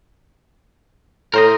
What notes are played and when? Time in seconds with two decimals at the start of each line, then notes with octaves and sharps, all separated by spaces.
1.34 A2 A4 A#4 C5 D#5